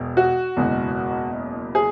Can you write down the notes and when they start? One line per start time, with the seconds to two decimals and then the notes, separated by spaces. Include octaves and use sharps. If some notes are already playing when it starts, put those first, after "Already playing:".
Already playing: E1 B2
0.17 F#4
0.57 F#1 E2 B2 G#3
1.75 G#4